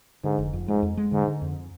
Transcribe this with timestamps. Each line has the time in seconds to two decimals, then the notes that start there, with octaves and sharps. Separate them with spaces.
0.24 G#2 D3
0.39 F1
0.53 F2
0.68 G#2 G#3
0.83 F2
0.97 G#3
1.12 G#2 D3
1.27 D3
1.42 F2